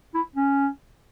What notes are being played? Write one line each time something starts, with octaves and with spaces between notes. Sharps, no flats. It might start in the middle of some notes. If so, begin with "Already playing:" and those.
E4
C#4